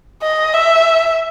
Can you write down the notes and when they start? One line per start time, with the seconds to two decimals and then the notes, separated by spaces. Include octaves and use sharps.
0.22 D#5
0.54 E5